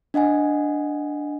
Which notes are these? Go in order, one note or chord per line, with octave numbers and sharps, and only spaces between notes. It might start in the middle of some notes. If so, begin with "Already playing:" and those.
D4 D#5 F#5 G#5